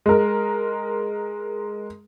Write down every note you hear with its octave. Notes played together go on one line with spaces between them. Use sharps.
G#3 A#4